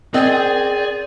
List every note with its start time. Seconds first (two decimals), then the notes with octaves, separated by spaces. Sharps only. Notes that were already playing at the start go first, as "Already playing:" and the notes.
0.14 C4 C#4 G#4 A#4 D5 D#5 G#5